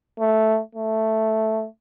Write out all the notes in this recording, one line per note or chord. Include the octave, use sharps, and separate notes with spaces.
A3
A3